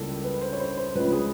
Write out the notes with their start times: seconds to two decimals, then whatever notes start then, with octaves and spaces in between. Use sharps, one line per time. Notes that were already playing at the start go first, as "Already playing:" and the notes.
Already playing: C#2 C#3 E3 G3 A#3 A4
0.24 B4
0.41 C5
0.52 C#5
0.60 C5
0.77 C5
0.95 C#2 C#3 F3 G#3 B4
1.12 G#4